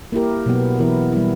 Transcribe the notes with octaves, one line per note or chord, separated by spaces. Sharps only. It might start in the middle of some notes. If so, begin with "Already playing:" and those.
A#3 E4 G4 A#4
B2 F#3 B3
E3 B3 E4 A#4
G3 B3 E4